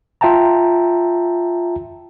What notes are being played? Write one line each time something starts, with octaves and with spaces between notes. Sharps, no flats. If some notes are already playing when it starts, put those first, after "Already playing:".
F4 E5 G5 A5 A#5